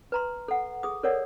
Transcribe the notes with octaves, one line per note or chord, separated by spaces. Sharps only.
B4 A#5 C6
A4 F#5
G#4 D#6
A4 A#4 C#5 D5 F#5